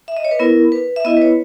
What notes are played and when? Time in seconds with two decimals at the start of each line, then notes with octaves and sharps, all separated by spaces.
0.08 E5
0.17 D#5
0.25 C#5
0.31 B4
0.39 B3 E4 A#4
0.72 B4
0.96 E5
1.05 B3 E4 D#5
1.17 B4
1.22 C#5